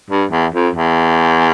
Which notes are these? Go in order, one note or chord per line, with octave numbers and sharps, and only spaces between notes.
G2
E2
F2
E2